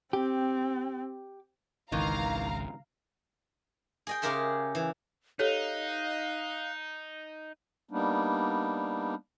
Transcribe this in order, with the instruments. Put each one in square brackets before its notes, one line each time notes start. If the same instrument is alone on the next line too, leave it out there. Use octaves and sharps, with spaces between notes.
[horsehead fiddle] C4 [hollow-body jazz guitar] G4
[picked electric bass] G#1 C#2 [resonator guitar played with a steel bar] D#3 E3 [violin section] F5 A#5
[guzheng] G#4 D#5 G5
C#3 G4 G#4 A#4 E5 C6
E3
[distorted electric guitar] D#4 [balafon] G4 A4 C#5 [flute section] D#5 F5 F#6
[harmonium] G3 A#3 B3 D4 D#4